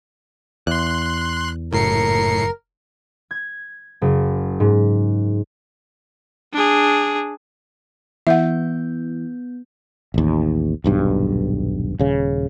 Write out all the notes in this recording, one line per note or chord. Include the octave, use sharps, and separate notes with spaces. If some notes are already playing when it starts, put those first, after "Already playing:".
E2 C6 F#6
F#1 A2 A#4 C7 C#7
G#6
F#1
G#2
D4 G#4
E3 B3 E5 F#5 G6
A1 D#2
D#1 B1 G2
D#1 C#3